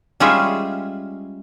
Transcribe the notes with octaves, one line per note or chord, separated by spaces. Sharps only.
G3 G#3 C#4 F4 G#4 E5